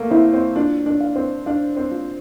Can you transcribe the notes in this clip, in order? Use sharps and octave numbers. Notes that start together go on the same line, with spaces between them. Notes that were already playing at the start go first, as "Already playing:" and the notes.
Already playing: A3 A#3
C4 E4
C4
D4 F4
D4
F5
C4
D4 F5
C4
F4